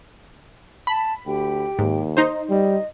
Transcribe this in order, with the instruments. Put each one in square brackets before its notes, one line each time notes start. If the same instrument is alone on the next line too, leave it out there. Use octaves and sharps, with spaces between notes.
[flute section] A5 [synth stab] B5
[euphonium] D2 [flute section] G4 G5
[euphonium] D#2 [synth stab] G#2
[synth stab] D#4 C5 [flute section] D#5
[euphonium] G3 [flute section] D#5